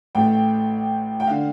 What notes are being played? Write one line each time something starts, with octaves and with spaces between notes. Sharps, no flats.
A1 A2 A3 G5
G5
D3 F5